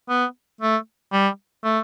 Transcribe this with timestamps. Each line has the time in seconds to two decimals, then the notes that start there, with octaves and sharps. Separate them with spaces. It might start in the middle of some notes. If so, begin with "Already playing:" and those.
0.09 B3
0.61 A3
1.13 G3
1.64 A3